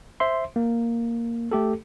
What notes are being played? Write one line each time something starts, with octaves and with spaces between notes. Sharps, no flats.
C5 E5 C6
A#3
A3 G4 A4